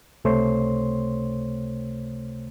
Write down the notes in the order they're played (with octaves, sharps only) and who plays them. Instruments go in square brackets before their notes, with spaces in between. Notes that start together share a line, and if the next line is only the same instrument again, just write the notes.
[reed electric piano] C#2 C3 A3 C5 C#5 C6